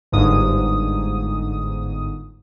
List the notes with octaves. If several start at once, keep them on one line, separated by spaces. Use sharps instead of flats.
G1 G#2 D#6